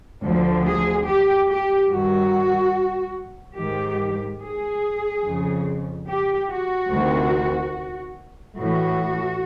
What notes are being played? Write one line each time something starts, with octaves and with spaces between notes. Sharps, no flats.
D2 D3 F3
G#4
G4
G4
G2 D#3 F#4
G#2 D#3 G4
G#4
F2 C#3 F3
G4
F#4
D2 C3 D#3
A2 E3 F#4